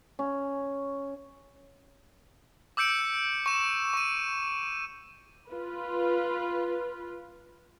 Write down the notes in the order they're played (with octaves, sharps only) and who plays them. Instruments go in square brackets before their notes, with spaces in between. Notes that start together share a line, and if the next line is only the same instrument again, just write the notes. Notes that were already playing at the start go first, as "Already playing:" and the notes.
[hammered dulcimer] C#4
[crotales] D6 E6 G6 C#7 D7
C#6 E7
C#6 D#7
[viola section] F4 B4